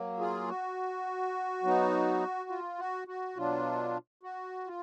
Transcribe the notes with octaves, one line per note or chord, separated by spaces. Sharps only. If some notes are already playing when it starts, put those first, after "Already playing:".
Already playing: F#3 A#3
F4 G#4
F#4
F#3 B3 D#4
F4
F#4
F#4
B2 F#3 D4 F4
F#4
F4